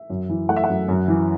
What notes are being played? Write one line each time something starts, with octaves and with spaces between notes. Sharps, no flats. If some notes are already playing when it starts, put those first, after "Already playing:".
Already playing: E5
F#2
E3
A3 F#5
E5
F#5
F#2
F#2
E3